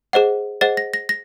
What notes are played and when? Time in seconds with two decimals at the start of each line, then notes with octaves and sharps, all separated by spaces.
0.13 G#4 C5 D#5 F#5
0.61 G#4 C5 D#5 F#5 A6
0.77 A#6
0.94 A#6
1.09 A#6